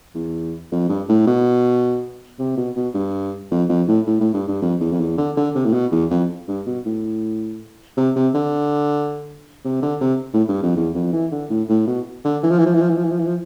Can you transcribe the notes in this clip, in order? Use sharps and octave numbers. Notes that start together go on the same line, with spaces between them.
E2
F2
G2
A2
B2
C3
B2
B2
G2
F2
F2
A2
A2
A2
G2
G2
F2
E2
F2
E2
D3
D3
C3
A2
B2
E2
F2
G2
B2
A2
C3
C3
D3
C3
D3
C3
A2
G2
F2
E2
F2
E3
D3
A2
A2
B2
D3
E3
F3
E3
F3
E3
F3
E3
F3
E3
F3
E3
F3